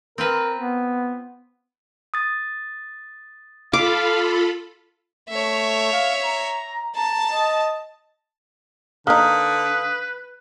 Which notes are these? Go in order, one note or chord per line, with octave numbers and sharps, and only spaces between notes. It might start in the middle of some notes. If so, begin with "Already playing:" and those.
C4 F4 A#4 B4
B3
D#6 A6
F4 A4 F5 B5 D6
A3 C#5 E5
F5
A#5
A5 A#5
D#5
D3 A#3 D#4 B4 F5 D#6 F6